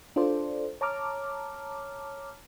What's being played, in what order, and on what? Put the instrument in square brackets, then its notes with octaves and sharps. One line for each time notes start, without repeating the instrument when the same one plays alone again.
[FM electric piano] D4 F4 A4 C5 D5
C#5 A5 A#5 D6 F6